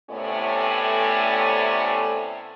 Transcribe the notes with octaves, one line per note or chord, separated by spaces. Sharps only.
A2 C3 A3 B3 C#4 D5